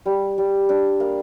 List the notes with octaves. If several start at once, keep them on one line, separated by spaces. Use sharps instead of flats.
G3
G3
D4
A#3